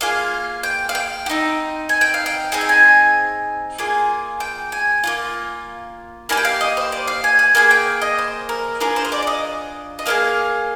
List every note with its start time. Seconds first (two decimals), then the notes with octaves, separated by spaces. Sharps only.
0.01 A#3 F4 G#4 F5
0.63 G5
0.89 F5
0.95 G5
1.26 G4
1.30 C4 D#4
1.89 G#5
2.01 G5
2.14 F5
2.26 G5
2.52 C4 D#4 G#4 G#5
2.61 G5
2.69 G#5
3.78 A#3 F4 G#4
4.40 G5
4.72 G#5
5.04 A#3 D4 F4
6.29 A#3 D#4 G4 G#5
6.37 G5
6.45 F5
6.61 D#5
6.77 C5
6.92 D5
7.08 F5
7.24 G#5
7.39 G#5
7.55 A#3 F4 G#4 G#5
7.71 G5
8.02 D#5
8.18 C5
8.49 A#4
8.80 D4 F4 G#4 A#4
8.96 C5
9.05 D#5
9.12 D5
9.22 D5
9.27 D#5
9.99 D#5
10.06 A#3 D4 G#4 F5